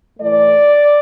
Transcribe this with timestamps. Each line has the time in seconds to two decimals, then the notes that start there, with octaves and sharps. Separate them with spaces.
0.19 A2 E3 A3 D5